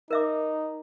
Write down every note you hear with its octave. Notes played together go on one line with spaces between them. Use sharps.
D#4 A#4 E5 D6